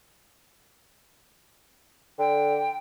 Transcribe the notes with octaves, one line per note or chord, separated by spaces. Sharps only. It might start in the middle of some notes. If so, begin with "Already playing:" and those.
D3 G5